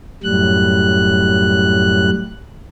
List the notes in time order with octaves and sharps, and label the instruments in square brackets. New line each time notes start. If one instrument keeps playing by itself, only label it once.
[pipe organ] F#2 A2 G3 F#6